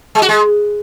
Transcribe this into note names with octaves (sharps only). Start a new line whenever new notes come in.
G#3
F#4
G#3